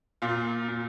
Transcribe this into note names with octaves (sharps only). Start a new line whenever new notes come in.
A#2 F4
A#2